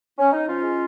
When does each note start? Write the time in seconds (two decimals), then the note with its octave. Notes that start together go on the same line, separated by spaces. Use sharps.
0.19 C#4
0.32 D#4
0.46 F3 C#4 F4
0.62 G#3